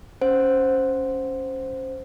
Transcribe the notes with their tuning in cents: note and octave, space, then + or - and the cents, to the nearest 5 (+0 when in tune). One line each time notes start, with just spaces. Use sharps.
C#4 +0 C5 +0 F#5 -15